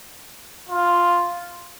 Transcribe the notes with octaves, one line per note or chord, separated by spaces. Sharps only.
F4